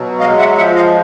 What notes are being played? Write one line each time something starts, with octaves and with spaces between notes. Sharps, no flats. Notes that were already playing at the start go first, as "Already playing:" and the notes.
Already playing: B2 F#3
G#3 D#5 F5
E5 F#5
F3 E5 F#5
D#5 F5